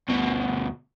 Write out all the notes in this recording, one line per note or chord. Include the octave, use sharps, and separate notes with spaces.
D2 B2